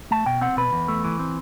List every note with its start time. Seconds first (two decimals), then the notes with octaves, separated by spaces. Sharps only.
0.11 A3 A5
0.26 B2 G5
0.41 C4 F#5
0.57 B2 B4
0.73 E2
0.88 A3
1.04 E3
1.19 C4